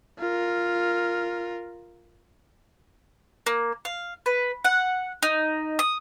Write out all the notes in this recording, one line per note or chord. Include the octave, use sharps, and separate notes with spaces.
F4 A#4
A#3
F5
B4
F#5
D#4
D#6